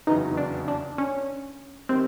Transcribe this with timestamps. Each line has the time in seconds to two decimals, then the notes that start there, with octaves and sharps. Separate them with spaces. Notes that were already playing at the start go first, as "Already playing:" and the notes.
0.07 F1 E2 C#3 F#3 B3 D#4
0.37 D4
0.68 D4
0.98 C#4
1.89 D#3 G3 C4